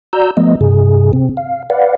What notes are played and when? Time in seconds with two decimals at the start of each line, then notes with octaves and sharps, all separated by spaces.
0.13 F#4 D5 A#5 E6 G6
0.37 F3 A3 B3 D#5
0.61 G2 C3 G#4
1.13 C3 C4
1.37 F5
1.70 B4 D5 F5 F#5